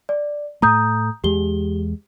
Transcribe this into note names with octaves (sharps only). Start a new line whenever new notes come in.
D5
A2 A3 A#5 D#6 G6
E2 G#3 G4 G7